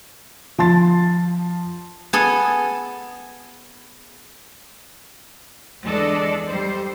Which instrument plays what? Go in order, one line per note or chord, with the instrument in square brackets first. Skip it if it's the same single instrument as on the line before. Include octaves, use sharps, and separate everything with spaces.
[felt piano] F3 A5 C6 A6
[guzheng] B3 G#4 A4
[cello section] E2 G#3 D4 A4 D5 D#5
G3 C5